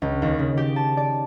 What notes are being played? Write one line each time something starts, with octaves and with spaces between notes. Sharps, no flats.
C#2
D#2
C#3
G4
A5
D5